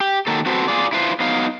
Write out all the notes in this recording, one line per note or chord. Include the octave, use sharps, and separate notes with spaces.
G4
D#3 F#3 A#3 A4
C4 F#4 A4 B4 C5
F4 G#4 D5
E4 F4 B4 C5
F#3 B3 D#4 F5